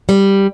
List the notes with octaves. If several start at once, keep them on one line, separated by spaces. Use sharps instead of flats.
G3